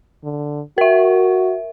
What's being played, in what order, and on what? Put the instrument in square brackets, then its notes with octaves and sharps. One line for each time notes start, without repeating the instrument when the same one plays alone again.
[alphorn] D3
[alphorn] F#4 [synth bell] A#4 E5